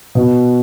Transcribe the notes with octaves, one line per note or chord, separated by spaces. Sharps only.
B2